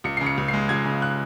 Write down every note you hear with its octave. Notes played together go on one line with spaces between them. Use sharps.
C#2 C#7
C#3 C7
C#7
C#2
C7
G#3
C#2 G#6
C#3
F#6